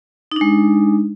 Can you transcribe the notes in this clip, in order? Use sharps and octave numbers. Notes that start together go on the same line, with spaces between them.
G#3 D4 D#4